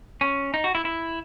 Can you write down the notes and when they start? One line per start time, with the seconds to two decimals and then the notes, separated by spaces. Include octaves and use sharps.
0.21 C#4
0.54 D#4
0.64 F#4
0.75 E4
0.85 E4